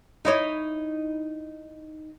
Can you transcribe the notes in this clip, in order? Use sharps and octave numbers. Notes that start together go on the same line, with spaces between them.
D#4 E4 C#5